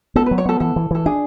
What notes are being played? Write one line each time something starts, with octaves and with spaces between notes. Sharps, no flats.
B3 A4
F#3 B4
C#5
B3 A4
E3 A4
E3
E3 A4
D4 G#4